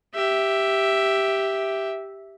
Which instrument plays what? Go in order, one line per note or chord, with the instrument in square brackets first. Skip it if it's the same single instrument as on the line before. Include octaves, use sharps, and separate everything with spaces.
[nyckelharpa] G4 E5